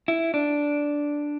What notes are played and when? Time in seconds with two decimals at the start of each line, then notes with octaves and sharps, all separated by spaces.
0.08 E4
0.34 D4